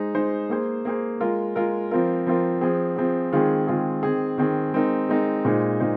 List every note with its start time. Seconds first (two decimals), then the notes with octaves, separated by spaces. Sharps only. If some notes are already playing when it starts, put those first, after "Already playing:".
Already playing: G#3 D#4 C5
0.15 G#3 D#4 C5
0.50 A#3 G#4 C5
0.85 A#3 G#4 C5
1.21 G#3 F4 A#4
1.56 G#3 F4 A#4
1.91 F3 C4 F4 A#4
2.27 F3 C4 F4 A#4
2.61 F3 C4 G#4
2.96 F3 C4 G#4
3.33 D#3 G#3 C4 F4 G#4
3.67 D#3 G#3 C4 F4 G#4
4.03 D#3 C4 G#4
4.38 D#3 C4 G#4
4.73 G#3 C4 D#4 A#4
5.09 G#3 C4 D#4 A#4
5.45 A#2 G#3 D#4 C5
5.80 A#2 G#3 D#4 C5